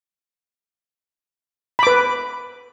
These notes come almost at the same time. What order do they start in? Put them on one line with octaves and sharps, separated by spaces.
B5 D6 B4